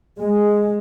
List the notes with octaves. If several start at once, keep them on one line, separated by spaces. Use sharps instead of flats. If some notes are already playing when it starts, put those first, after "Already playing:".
G#3